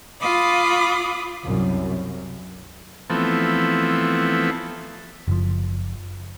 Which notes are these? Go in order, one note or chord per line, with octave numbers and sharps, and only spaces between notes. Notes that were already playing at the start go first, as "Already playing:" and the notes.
F4 B5 D6 D#6
C2 F#2
E3 F3 A3 B3 C4
F#1 F3